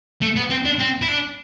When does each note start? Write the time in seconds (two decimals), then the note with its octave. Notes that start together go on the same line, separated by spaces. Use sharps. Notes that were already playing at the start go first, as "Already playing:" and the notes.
0.22 A3
0.36 B3
0.50 C4
0.65 D4
0.79 C4
1.02 E4
1.08 D4